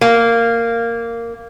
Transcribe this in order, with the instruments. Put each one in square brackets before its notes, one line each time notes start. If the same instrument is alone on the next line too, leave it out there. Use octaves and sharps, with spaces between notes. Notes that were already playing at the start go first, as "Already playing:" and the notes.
[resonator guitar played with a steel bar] A#3